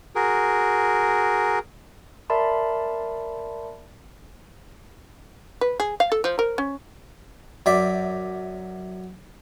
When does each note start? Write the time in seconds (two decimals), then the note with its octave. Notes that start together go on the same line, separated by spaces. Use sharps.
0.15 F#4 G#4 A#4
2.30 A#4 D5 E5 A5 B5 C6
5.61 B4
5.80 G#4
6.00 F5
6.12 A4
6.24 F3
6.39 A#4
6.58 C#4
7.66 F#2 D5 E5